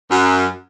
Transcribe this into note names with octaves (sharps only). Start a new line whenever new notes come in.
F#2